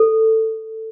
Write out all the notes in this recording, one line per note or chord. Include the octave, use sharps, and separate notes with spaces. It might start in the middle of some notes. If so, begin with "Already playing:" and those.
Already playing: A4